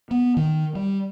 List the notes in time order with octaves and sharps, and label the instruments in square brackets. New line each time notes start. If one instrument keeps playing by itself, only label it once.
[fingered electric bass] B3
D#3
G3